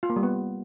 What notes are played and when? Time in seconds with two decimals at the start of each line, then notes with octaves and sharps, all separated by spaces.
0.03 F4
0.10 A#3
0.16 G3
0.23 B3